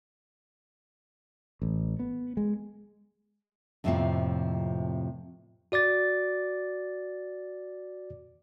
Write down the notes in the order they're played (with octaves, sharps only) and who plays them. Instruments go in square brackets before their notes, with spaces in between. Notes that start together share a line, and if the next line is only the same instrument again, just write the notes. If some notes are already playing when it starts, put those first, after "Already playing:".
[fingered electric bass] A1
B3
G#3
[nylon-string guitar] F2 A2 C3 F3 A3 A#3
[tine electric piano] F#4 D5 D6 A6